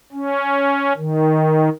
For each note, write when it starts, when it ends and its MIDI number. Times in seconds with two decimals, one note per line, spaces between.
0.12 0.93 61
0.97 1.69 51